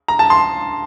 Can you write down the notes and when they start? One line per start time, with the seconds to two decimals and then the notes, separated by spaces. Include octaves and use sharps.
0.08 A#5
0.19 A5
0.30 C6